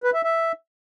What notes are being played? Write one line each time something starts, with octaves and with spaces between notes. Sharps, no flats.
B4
E5
E5